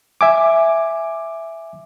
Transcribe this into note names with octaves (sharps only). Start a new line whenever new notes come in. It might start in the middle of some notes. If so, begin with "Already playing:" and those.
E5 G#5 D6